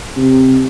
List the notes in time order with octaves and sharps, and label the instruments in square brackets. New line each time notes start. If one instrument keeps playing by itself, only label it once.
[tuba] C3